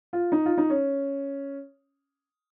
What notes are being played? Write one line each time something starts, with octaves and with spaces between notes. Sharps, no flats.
F4
D#4
F4
D#4
C#4